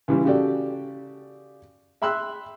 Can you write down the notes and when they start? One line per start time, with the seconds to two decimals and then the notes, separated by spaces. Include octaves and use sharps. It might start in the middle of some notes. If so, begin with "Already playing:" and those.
0.08 C#2 E3 G3
0.25 C#3 F#4 G4 A4 D5
2.02 E5 G5 B5 C6 E6 F#6